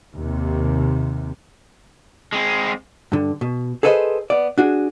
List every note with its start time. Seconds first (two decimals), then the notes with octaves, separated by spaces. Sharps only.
0.17 D#2 C3
2.33 G#3 C4
3.12 G2 D3
3.41 B2
3.83 G#4 A4 B4 C5 D#5
4.30 B3 D5
4.58 D4 F#4 G#4